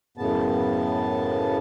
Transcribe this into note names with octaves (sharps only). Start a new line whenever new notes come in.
F#2 A2 C#3 B3 A5